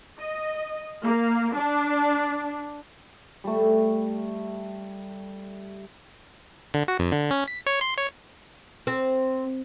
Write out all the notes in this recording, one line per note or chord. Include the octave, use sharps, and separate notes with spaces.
D#5
A#3
D4
G3 A3
D3
F#4
F2
D3
C#4
B6
C#5
C6
C#5
C4